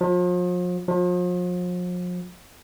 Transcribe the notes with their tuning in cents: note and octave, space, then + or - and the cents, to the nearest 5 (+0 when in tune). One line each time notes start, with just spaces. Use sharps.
F3 +40
F3 +40